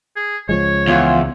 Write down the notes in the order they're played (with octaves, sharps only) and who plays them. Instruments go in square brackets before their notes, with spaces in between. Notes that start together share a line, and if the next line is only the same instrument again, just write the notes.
[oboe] G#4
[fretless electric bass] C#2 F3 G#3 [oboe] C#5
[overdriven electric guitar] E2 [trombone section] F4